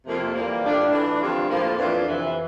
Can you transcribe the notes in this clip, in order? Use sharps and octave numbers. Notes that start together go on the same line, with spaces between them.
F2 C3 F3 A#3 F4
E3 G3 A#3
A2 G3 D4 F4
E3 A3 D4
G2 D3 F3 C4 F4
A2 F3 A#3
F2 E3 A3 D4 F4
F2 C3 E3